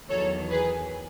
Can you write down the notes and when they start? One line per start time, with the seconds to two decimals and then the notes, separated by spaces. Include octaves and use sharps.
0.09 E2 D#3 F#3 A4 C#5
0.50 G#4 B4